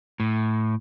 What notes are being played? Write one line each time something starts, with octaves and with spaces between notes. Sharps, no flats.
A2